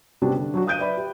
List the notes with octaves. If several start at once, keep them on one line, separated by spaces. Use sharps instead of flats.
C3 G3 B3 C#4 D4 F#4
D3
F#3 D4 F#4
F5 D#6 F#6 G6 D7 D#7
B4 D5 E5 B5
G4